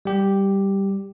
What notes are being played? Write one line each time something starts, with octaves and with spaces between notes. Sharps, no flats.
G3 G4